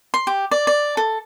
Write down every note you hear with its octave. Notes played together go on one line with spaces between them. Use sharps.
C6
G4
D5
D5
A4